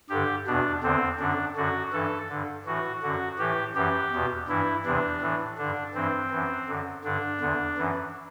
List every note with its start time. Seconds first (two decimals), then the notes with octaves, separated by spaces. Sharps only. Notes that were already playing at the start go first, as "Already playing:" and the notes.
0.10 G2 D3 G4
0.47 E2 B2 D4
0.83 E2 D3 C4
1.20 F#2 D3 D4
1.56 F#2 D3 F#4
1.92 G2 E3 A4
2.29 G2 D3
2.66 A2 E3 F#4
3.02 F#2 D3 F#4
3.39 A2 E3 G4
3.75 F#2 E3 G4
4.12 E2 B2
4.48 G2 E3 E4
4.85 E2 C3 E3 D4
5.21 A2 E3
5.58 G2 D3 D4
5.94 G2 E3 C4
6.31 F#2 E3
6.68 F#2 D3
7.04 G2 D3 D4
7.41 E2 D3
7.78 F#2 E3